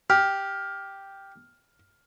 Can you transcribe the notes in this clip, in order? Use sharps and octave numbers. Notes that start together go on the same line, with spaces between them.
G4 F6